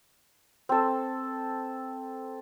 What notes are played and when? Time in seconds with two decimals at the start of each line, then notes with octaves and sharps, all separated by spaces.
0.69 C4 A4